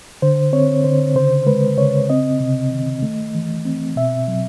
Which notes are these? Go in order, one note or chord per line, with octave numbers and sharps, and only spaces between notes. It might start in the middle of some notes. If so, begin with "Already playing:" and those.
D3 C5
C4 C#5
D3 C5
C#3 C5
G#3 B4
C#3 C#5
C4 D#5
C3
D#3
A3
E3
C4
B2 E5
F#3